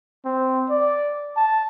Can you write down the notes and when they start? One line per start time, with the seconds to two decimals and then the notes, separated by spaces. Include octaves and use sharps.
0.25 C4
0.70 D5
1.37 A5